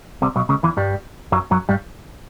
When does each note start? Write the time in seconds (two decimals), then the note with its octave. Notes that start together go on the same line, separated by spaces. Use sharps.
0.22 C2 C3
0.36 B1 B2
0.49 C#2 C#3
0.63 E2 E3
0.77 G2 G3
1.32 F#2 F#3
1.51 F#2 F#3
1.69 G2 G3